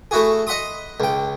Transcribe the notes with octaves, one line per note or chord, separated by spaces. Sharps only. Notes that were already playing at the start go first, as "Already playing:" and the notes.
A3 E4 F#4 G#4
D#5 F#5 B5 C6 D#6
C#2 G5